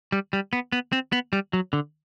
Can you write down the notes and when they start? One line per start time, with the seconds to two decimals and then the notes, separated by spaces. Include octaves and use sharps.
0.12 G3
0.33 G3
0.53 B3
0.72 B3
0.92 C4
1.12 B3
1.33 G3
1.53 F#3
1.73 D3